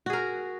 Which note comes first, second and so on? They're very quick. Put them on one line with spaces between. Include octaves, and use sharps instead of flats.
F#4 G#4 A#4